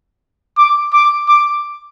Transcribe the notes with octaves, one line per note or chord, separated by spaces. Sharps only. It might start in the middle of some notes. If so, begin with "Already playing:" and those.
D6
D6
D6